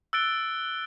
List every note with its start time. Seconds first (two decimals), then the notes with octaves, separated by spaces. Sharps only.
0.13 E6 F#6 A6 D7 G7